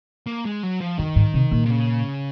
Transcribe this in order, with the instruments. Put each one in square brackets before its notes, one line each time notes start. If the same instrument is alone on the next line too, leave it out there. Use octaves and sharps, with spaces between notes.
[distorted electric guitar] A#3
G#3
F#3
F3
[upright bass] F#2 [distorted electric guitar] D#3
[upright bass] G#2
C3
A#2
[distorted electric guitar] C3
C#3